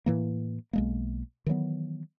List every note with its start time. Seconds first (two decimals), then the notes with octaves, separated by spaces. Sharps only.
0.06 A2 E3 A#3
0.73 B1 G#3 A#3
1.46 D#3 E3 F#3 B3